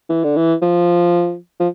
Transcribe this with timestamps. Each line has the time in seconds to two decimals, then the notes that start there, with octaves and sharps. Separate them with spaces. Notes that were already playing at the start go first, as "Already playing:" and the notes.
0.09 E3
0.24 D3
0.36 E3
0.62 F3
1.60 F3